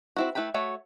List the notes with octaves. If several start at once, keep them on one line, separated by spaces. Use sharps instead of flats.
C4 E4 F#4
A3 E4 B4 G5 B5
A3 F#4 C#5 E5